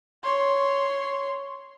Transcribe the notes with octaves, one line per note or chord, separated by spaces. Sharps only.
C#5 C6